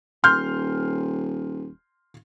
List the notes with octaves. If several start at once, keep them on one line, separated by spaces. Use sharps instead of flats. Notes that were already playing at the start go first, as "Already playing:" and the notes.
D#1 C6 F6 G6